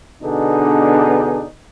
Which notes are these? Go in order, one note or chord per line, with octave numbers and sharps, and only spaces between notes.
B2 D3 B3 D4 D#4 G#4